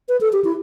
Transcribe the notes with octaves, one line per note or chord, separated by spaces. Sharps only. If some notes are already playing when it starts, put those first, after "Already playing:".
B4
A4
G4
E4